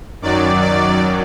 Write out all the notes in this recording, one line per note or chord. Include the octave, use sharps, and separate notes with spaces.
F#2 D#3 F#3 D5
D5